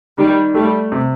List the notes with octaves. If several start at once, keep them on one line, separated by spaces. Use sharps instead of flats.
D#3 G3
G3 A3
C3